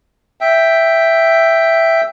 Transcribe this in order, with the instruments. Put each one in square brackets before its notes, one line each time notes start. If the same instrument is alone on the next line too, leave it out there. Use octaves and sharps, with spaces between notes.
[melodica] E5 G5